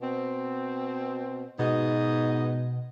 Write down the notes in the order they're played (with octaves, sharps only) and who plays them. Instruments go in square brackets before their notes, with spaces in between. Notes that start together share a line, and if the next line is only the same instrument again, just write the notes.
[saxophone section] B2 C4
[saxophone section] G#2 B3 D#5 [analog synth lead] B2